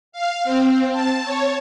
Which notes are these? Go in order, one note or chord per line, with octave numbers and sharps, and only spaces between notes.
F5
C4
A5
C#5